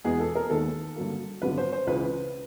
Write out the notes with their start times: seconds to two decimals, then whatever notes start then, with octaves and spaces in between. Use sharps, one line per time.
0.04 E2 B2 G#3 B3 G#4
0.20 A4
0.35 A#4
0.50 D#2 D#3 G#3 B3 A4
0.96 G2 D3 F#3 A#3
1.42 G#1 F#2 D3 G3 B3 B4
1.58 C5
1.73 C5
1.87 C#2 C#3 E3 B4